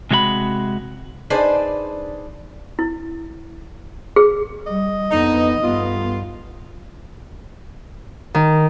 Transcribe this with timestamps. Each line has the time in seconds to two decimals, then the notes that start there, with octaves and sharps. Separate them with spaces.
0.11 C3 G#3 F#4 E5 B5
1.30 D4 D#4 G#4 B4 C5 D5
2.79 E4
4.16 G#4
4.67 G3 D#5
5.11 F2 D3 B3 D#4
5.62 G2 A3 B3 F4
8.34 D#3